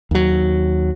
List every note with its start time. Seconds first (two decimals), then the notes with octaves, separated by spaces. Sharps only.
0.11 D#2 F#3